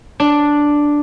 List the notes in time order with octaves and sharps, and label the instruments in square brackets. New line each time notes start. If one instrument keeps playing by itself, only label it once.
[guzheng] D4